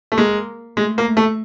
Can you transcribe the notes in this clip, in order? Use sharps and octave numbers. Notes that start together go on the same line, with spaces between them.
A3
G#3 A#3
G#3 A3
A#3
A3
A3